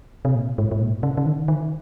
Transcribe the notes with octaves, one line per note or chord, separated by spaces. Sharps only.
C3
A#2
G#2
G#2
A#2
C#3
C#3
D#3
D#3